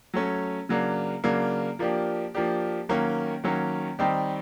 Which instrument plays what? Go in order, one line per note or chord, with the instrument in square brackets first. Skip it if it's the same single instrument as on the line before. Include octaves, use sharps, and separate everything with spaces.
[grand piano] F#3 A3 C#4
C#3 F#3 A#3 D4
C#3 F#3 A#3 D4
F3 A#3 D4 G4
F3 A#3 D4 G4
D#3 F#3 A#3 C#4
D#3 F#3 A#3 C#4
D#3 G3 C4 D#4 G4